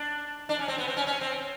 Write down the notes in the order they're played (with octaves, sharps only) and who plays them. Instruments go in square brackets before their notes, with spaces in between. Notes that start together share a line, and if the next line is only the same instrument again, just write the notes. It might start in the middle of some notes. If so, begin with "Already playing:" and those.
Already playing: [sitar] D4
D4
C#4
C4
B3
C4
C#4
C#4
C4